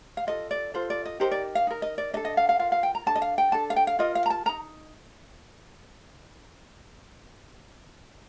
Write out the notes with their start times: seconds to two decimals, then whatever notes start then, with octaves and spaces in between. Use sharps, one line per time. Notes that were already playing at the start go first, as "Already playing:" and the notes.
0.17 F5
0.27 F4 A4 D#5
0.51 D5
0.74 F4 A4 C5
0.90 D5
1.05 D#5
1.20 D#4 G4 A#4 C5
1.31 D5
1.55 F5
1.67 D#4 A#4
1.82 D#5
1.98 D5
2.13 D4 D#5
2.17 A4
2.25 D#5
2.37 F5
2.49 F5
2.59 F4 A#4 F5
2.72 F5
2.83 G5
2.95 A#5
3.06 D4 A4 A5
3.16 D#5
3.22 F5
3.38 G5
3.52 D4 A4 A5
3.70 F5
3.76 G5
3.87 F5
3.99 F4 A#4 D#5
4.15 F5
4.26 A#5
4.30 A5
4.46 D#4 A#4 A#5